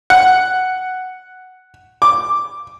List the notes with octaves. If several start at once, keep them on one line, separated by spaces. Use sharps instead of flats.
F#5
D6